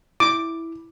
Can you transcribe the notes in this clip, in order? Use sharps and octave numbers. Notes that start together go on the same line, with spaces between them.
E4 D6